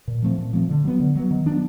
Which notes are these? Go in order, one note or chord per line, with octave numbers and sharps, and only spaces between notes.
A#2
F3 A3 C4
A#2
F3 A3 C4
D3
F#3 B3
D3
F#3 B3
D#3
F#3 B3 D4